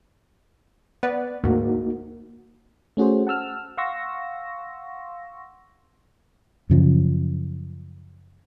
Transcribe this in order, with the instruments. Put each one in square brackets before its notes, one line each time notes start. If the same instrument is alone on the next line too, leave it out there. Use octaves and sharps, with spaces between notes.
[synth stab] B3 B4 D5
[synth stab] D2 G#2 [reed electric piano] A#3 D#4 F#4
[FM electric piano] A3 C#4 F#4 G#4 C5
F#5 A5 E6 F6
F5 F#5 C6 C#6 E6 A#6
[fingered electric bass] F#2 C#3 F3